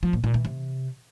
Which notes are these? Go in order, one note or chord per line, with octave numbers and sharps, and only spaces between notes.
F3
A#2
A#2
E3
C3